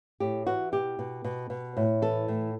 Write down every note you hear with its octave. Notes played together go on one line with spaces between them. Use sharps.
A2 G4
E3 F#4
B2 G4
B2
B2
B2
A2
E3 A4
A2